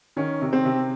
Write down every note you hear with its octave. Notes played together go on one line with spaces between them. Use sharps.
D#3 C#4
C3
C4
C3